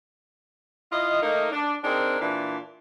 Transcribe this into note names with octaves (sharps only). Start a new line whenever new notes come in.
E4 F4 D#5
A3 A#3 D#4
D4
C4 D4 D#4 G#4 A#4
A#2 E3 D4